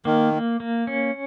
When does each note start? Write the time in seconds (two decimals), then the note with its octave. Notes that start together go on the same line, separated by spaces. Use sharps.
0.05 D#3 A#3
0.33 A#3
0.60 A#3
0.87 C#4